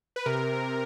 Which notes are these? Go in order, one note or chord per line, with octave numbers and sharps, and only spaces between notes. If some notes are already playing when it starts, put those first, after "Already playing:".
B4
C3 A#4